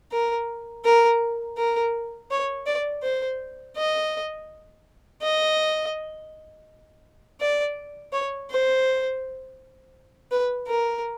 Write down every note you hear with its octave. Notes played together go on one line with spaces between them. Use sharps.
A#4
A#4
A#4
C#5
D5
C5
D#5
D#5
D5
C#5
C5
B4
A#4